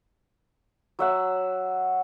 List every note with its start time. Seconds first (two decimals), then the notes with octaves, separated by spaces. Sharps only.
0.99 F#3 E5 F#5